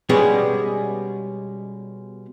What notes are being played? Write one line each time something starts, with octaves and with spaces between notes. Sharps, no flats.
B2 G3 G#3 B3 C#4 G#4